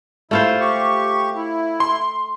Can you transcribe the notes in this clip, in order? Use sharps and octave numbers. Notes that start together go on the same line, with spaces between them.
A3 E4 F4 C5
G4 C#6
E4
C6